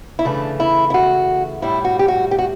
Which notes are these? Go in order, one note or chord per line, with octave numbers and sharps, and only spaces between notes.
E4
C#3 E3 A3 D4
E4
E4
F#4
A2 G3 E4
F#4
G4
F#4
G4
F#4